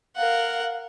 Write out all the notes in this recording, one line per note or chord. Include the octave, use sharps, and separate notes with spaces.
A#4 F5 F#5